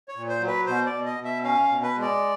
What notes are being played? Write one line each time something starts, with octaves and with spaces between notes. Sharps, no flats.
C#5
A#2
C5
F#3
B4
B2 C5
D5
B2
D#5
B2
E5
C#4 F5
F5
B2
B4
G#3
D5